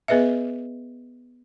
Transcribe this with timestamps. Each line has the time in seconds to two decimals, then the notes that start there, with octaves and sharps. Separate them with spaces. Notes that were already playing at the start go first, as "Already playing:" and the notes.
0.08 B3 G#4 B4 D#5 E5